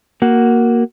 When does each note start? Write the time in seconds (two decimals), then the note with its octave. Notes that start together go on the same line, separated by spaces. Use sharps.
0.22 A#3 F#4